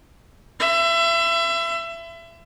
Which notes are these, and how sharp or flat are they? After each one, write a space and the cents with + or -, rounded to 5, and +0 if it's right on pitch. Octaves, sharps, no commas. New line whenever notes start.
E5 +30 C6 -45